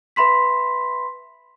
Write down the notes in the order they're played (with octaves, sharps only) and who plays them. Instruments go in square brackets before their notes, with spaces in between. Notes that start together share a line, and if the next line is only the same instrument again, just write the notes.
[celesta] B4 E5 B5 C6 B6